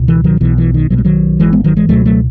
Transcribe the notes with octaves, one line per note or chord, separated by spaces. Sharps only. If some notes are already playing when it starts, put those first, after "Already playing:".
Already playing: C#2 B2
E3
D#3 F#3
B1 B2 E3
E3
D#3
B1 B2 F#3
G#3
D#3 F#3
G#1 G#2 E3 G#3
G#3 B3
D#3 F#3
E3 G#3
C#2 B2 F#3 A3
F#3 A3